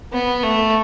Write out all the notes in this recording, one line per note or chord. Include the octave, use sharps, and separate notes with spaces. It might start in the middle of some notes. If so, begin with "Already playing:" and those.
B3
A3